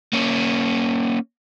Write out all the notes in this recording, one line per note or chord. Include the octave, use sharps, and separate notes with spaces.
A#3 C#4